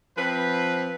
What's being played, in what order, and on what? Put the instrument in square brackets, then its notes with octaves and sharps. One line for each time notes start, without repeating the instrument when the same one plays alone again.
[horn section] F3 C4 B4